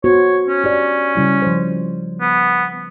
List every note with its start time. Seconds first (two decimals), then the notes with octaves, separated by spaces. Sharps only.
0.04 B3 F#4 C5 C#5
0.47 C#4
0.64 G4 C#5 D5
1.16 C#3 G3 E4
1.42 F3 C5
2.21 B3